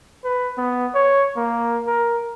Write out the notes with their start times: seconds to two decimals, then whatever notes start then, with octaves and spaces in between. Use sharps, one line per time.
0.24 B4
0.57 B3
0.95 C#5
1.37 A#3
1.87 A#4